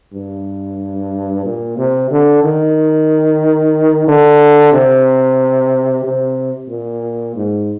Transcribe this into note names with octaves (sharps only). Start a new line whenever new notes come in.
G2
A#2
C3
D3
D#3
D3
C3
C3
A#2
G#2